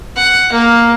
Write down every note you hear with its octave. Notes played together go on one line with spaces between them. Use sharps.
F#5
A#3